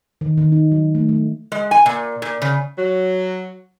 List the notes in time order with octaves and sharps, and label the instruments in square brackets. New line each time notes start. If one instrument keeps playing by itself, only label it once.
[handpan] D#3
D#3
D#4
F#3
A3
A3
[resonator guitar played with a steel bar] G#3
G#5
A#2
A#2
C#3
[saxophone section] F#3